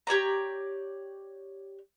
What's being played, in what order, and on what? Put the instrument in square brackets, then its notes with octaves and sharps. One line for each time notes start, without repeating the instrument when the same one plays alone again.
[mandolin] G4 C#5 D5 A#5